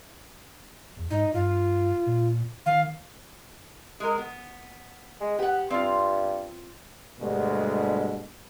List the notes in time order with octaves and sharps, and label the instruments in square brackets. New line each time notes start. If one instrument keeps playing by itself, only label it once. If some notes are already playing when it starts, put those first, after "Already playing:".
[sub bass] E2
[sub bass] G#2 [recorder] D#4
[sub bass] G2 [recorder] F4
[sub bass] A#2
[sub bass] D#3 [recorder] F5
[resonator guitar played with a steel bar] G#3 A#4
B3
[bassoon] G#3
[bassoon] B3 [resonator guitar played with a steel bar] G4 F#5
[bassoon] G2 [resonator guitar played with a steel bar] C4 F4
[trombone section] D2 G2 B2 G3 G#3